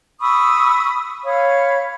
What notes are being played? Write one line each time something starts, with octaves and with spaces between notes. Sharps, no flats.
B5 C#6 D#6 E6
C#5 F5 B5